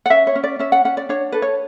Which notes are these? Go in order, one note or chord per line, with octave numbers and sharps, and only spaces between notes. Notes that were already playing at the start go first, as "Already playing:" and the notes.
F#5
C#4 E5
C#5
C#4
D5
C#4 E5
F#5
C#4 F#5
D5
D4 C#5
A4 B4
C#5